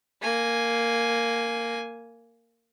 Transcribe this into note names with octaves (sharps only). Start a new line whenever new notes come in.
A#3 G#5